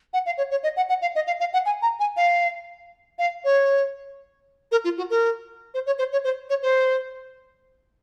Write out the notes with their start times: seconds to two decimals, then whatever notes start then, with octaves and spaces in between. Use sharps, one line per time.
0.13 F#5
0.26 F5
0.38 C#5
0.51 C#5
0.63 D#5
0.76 F#5
0.89 F#5
1.02 F5
1.15 D#5
1.27 F5
1.40 F5
1.53 F#5
1.66 G#5
1.82 A#5
2.00 G#5
2.17 F5
3.19 F5
3.44 C#5
4.71 A#4
4.84 F4
4.97 F#4
5.10 A#4
5.74 C5
5.86 C#5
5.98 C5
6.12 C#5
6.24 C5
6.49 C#5
6.62 C5